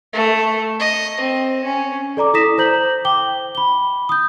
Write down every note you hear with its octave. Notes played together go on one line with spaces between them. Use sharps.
A3
D#5
C4
C#4
A4 D5 A#5 D6
E4 A4 D#6 A#6 B6 E7
C5 A#5 G6 F#7
G5 D6 G7
B5 G7
D#6 G6